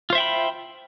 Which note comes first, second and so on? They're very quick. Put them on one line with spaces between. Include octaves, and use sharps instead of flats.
F4 C5 E5 G5 B5